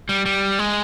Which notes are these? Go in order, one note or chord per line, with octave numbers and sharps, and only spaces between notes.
G3
G3
G#3